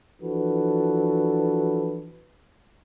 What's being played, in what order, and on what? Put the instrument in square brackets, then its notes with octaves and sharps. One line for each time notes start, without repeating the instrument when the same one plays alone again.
[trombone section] E3 F3 D4 F#4 A4 B4